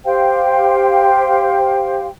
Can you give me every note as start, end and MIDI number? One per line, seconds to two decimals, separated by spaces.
0.04 2.07 67
0.04 2.07 72
0.04 2.07 77
0.04 2.07 79